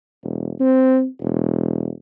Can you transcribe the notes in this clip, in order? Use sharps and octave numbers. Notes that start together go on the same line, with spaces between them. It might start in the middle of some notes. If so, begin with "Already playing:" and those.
E1
C4
E1